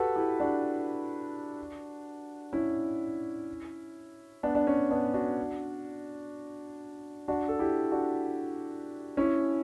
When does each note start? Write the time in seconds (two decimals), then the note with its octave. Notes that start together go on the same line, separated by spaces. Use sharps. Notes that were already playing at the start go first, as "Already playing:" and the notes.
Already playing: F#4 G4 A4 B4
0.16 E4 G4
0.40 D4 F#4
2.53 C#4 E4
4.43 B3 D4
4.55 D4
4.67 C#4
4.91 B3 D4
5.14 D4 F#4
7.28 D4 F#4
7.48 A4
7.59 E4 G4
7.91 D4 F#4
9.17 C#4 E4